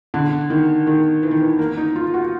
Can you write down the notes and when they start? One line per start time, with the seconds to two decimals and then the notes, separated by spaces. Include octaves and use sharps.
0.14 D3
0.50 D#3
0.87 D#3
1.23 E3
1.31 D#3
1.39 E3
1.59 A#3
1.77 D#4
1.96 F4
2.14 F#4